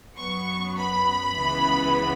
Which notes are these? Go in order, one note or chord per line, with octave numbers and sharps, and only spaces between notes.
F#2 F#3 B3 C#6
B5
C#2 C#3 E3 B3